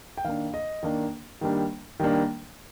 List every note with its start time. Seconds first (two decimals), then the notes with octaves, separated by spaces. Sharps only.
0.18 G5
0.25 D#3 A#3 D4 F5
0.54 D#5
0.83 D#3 A#3 D4
1.41 D#3 G3 A#3 D4
2.00 D#3 G3 A#3 D4